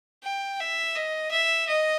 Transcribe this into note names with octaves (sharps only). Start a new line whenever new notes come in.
G5
E5
D#5
E5
D#5